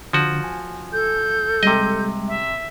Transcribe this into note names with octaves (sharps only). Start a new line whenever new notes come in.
D3 F3 F#4
G#5
A4 G6
C3 G3 G#3 D#5
E5